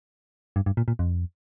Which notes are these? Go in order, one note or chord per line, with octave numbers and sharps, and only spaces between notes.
G2
G2
A#2
A#2
F2